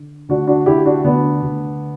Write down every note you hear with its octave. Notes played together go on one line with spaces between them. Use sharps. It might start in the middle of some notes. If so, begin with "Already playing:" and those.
Already playing: D3
D2 D4 F#4
D4 F#4
D2 E4 G4
D4 F#4
D2 B3 D4
D2